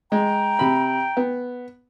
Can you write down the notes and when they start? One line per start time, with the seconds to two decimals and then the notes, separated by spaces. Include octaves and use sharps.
0.12 G#3 G5 A#5
0.59 C3 B5
1.17 B3